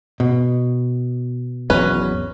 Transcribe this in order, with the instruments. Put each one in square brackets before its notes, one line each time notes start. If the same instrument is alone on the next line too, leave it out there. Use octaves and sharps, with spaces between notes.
[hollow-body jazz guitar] B2
[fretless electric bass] G#1 E2 F#3 [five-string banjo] C#4 B4